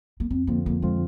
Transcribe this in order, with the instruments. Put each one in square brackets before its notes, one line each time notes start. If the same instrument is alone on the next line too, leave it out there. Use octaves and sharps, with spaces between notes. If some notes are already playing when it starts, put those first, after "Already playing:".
[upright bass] A#3
[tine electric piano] F2 [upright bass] C4
[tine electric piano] D3 F3 C4 F4 [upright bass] A#3
[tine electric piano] F2 [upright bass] A#3
[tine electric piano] D3 F3 C4 F4 [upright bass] G#3